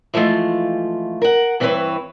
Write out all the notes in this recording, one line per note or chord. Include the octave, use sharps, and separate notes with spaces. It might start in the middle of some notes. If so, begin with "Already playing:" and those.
E3 F3 G#3 A3 F4
A#4 F#5
G2 E3 C4 C#4 B4 C#5